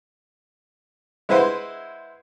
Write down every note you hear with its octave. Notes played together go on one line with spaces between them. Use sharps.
G#3 E4 B4 C5 F#5